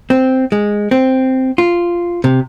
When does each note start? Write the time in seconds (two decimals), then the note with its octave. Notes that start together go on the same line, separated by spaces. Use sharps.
0.10 C4
0.52 G#3
0.91 C4
1.58 F4
2.24 C3